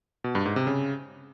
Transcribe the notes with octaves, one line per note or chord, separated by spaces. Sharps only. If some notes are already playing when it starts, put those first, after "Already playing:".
B2
G2
G#2
C3
C#3